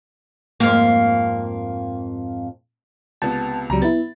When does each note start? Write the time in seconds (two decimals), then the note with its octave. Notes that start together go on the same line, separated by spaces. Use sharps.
0.60 F2 G#2 A#3
3.22 C#2 C3 B3 A5
3.70 C#2 C3 F#3 G3 A#5
3.82 B3 E4 A6